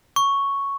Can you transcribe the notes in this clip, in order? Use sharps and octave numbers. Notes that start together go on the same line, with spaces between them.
C#6